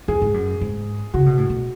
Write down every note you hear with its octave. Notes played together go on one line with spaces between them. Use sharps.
F#2 G#4
G#2
F#2
G#2
C#3 F#4
B2
A2
B2